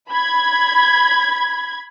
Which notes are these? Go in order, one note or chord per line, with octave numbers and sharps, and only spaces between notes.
B5 G#6